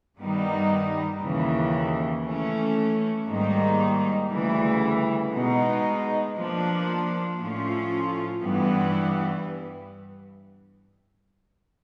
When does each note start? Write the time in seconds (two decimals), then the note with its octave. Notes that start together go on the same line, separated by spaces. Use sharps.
0.17 G2 D#3 G3 B3 D#4
1.21 D#2 C#3 E3
2.24 E3 A3 C#4
3.27 G#2 D#3 G3 A#3 D#4
4.30 D2 C#3 E3 G3
5.33 B2 G#3 B3 D#4
6.36 F3 A#3 D4
7.39 A2 F3 A3 C#4 F4
8.42 G2 E3 G3 B3